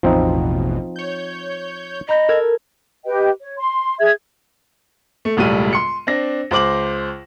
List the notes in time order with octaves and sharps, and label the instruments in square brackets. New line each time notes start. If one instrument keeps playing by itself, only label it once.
[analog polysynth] A1 E2 B2 [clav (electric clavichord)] F3 C4 D#4
[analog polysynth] C#5 G6
[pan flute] D#5 [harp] A#5 B5 G6
[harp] A4 A#4 G#6
[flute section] G4 B4 D#5 G5
C#5
C6
G#4 E5 G#6
[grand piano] A3
E1 C#2 A2 G3 D#7
C6 C#7
C4 D4 A#6
C#2 C5 D6 F#7